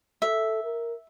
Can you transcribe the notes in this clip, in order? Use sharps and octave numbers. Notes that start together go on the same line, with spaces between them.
A4 E5
A#4